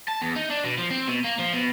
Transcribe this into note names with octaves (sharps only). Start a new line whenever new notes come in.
A5
E2
D#4
D4
B2
F3
C4
B2
A#3
F3
B2